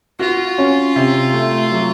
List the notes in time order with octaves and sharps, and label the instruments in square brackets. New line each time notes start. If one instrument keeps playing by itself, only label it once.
[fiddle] F4 [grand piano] F#4
[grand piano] C#4
C3
A3
F#3